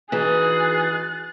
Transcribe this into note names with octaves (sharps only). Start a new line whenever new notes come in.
E3 D#4 F#4 G#4 F#6 A6